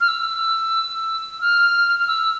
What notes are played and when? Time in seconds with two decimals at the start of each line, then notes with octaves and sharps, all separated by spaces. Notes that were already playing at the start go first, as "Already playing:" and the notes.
0.01 F6
0.08 E6
1.41 F6
2.00 F6
2.08 E6